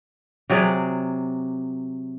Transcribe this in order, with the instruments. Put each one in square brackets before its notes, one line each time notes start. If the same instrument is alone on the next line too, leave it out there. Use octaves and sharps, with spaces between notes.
[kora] C3 F#3 G#4 D5